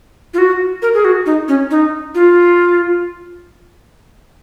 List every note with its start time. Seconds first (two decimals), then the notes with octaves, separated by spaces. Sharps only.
0.34 F4
0.38 F#4
0.82 A#4
0.94 G#4
1.05 F#4
1.26 D#4
1.48 C#4
1.71 D#4
2.15 F4